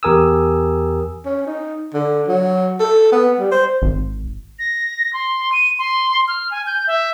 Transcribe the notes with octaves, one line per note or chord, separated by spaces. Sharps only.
E2 G4 A#4 G#5 D#6 E6
C#4
D#4
D3
F#3
A4
B3
G3
C5
G#1
A#6
C6
D#7
C6
F6
G#5
G6
E5